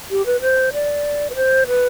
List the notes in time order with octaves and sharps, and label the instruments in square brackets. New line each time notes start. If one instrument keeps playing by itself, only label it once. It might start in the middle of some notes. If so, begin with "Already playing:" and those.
[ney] G4
B4
C5
D5
B4
C5
B4